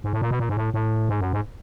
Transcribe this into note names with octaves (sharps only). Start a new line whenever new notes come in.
G#2
A2
A#2
B2
A#2
G#2
A2
A2
G#2
F#2
G#2